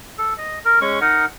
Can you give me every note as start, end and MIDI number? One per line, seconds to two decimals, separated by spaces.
0.18 0.34 69
0.38 0.59 75
0.65 0.79 70
0.81 0.99 56
0.81 0.99 61
0.81 0.99 85
1.01 1.25 63
1.01 1.25 70
1.01 1.25 75
1.01 1.25 78